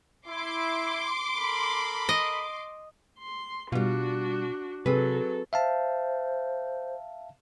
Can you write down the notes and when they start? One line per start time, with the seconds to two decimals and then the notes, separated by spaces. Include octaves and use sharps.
0.28 E4 C6 D6
1.35 A4 A#4 B5
2.09 D#5
3.19 C6
3.72 B2 G3 D4 F4 F#4
4.86 C3 F#3 C4 G#4 A4 B4
5.53 C5 E5 F5 A5